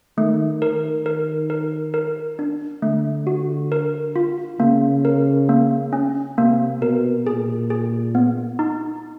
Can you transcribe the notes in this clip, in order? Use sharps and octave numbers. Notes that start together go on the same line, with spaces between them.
D#3 A3
D#3 A#4
A#4
A#4
A#4
D4
D3 A3
F#4
A#4
F4
C#3 A#3
A#4
A#3
C#4
C3 A#3
B2 A#4
A#2 G#4
G#4
B3
D#4